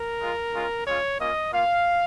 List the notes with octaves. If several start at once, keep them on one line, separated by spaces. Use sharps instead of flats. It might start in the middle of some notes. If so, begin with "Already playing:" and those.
Already playing: A#4
G#3 F4
G#3 C#4 F4
G#3 C#4 F4 C#5
A#3 C#4 F4 D#5
A#3 F4 F5